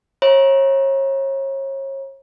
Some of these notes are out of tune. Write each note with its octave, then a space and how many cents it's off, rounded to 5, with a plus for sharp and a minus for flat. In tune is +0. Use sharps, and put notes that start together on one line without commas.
C#5 -35 E5 -25 A#5 +30